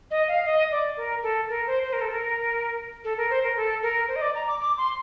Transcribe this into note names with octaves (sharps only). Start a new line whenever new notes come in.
D#5
F5
D#5
D5
A#4
A4
A#4
C5
C5
A#4
A4
A#4
A4
A#4
C5
A#4
A4
A#4
C5
D#5
D5
A#5
D6
D6
C6